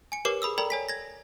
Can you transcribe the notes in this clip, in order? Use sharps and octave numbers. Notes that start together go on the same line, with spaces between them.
G#5 C#7
G4 A#4 B4 C#5 D6 C7
G#4 B5 D#6 E6
A4 A#4 D5 G5 A#5 B5
C#5 G#5 B6
G#6 A#6